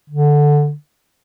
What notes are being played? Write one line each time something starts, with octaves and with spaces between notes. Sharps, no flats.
D3